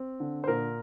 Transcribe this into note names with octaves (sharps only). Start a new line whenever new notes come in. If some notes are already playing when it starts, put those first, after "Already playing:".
Already playing: C4
D3
C5
A#2 A#4